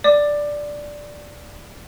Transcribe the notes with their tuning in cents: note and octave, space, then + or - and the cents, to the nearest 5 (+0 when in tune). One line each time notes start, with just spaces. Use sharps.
D5 +0 D6 +20